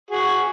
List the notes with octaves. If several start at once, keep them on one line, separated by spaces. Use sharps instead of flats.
F#4 G#4